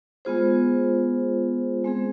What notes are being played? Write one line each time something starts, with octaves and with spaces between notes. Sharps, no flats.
G#3 B3 F4 G#4 C5
G#3 C4 G#4